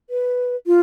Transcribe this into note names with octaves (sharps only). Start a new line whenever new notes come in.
B4
F4